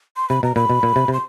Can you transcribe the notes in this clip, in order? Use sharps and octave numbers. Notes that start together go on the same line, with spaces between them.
C6
C3 B5
B2 A#5
A#2 B5
B2
A#2
C3
C3
C6